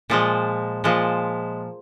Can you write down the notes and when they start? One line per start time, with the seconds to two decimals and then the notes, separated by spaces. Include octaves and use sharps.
0.10 A#2 F3 G#3
0.84 A#2 F3 G#3